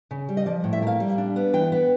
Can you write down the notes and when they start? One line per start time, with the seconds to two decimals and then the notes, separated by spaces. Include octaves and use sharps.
0.11 C#3
0.29 G3
0.37 D#5
0.46 F3 D5
0.64 A2
0.73 E5
0.82 A#3 F5
1.00 G3
1.18 D4
1.36 B3
1.53 E3 G5
1.72 B3